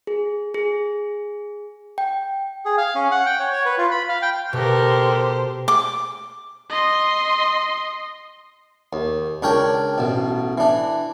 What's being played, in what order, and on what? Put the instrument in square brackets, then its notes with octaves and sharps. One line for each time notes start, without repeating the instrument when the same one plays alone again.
[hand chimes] G#4
G#4
G5
[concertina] G#4
F5
C#4
F#5
G5
C#5
C#5
B4
F4
B5
F5
G5
[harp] B2 [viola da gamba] G4 [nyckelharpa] A4 A#4 [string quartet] C5
[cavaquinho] D6
[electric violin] D#5 C6
[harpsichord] D#2
C#2 D4 A#4 C#5 G5
A1 B2
E3 D4